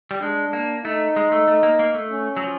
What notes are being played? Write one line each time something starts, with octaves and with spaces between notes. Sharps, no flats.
G3
G#3 D4
A#3
A3 D#4
G#3
A3
A3
A#3
A#3
A3
C#4
F#3
F3